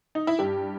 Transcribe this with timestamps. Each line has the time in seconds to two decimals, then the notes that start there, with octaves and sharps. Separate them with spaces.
0.15 D#4
0.27 E4
0.39 G2 G3 G4